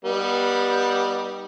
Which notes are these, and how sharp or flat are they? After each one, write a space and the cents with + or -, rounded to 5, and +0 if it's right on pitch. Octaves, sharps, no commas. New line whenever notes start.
G3 +0 B3 -25 D#4 -5